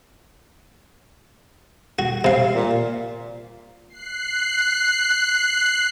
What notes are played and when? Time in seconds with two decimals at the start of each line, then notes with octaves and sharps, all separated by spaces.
1.99 F#4
2.24 C3 F5
2.55 A#2
3.89 F#6 C7